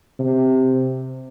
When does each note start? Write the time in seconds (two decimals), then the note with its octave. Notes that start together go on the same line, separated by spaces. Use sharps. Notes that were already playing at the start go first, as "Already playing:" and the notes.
0.19 C3